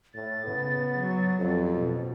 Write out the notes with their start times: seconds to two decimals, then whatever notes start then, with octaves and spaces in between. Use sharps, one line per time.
0.14 A2 A6
0.45 C#3 B3
0.99 F#3
1.39 A1 F2
1.77 B2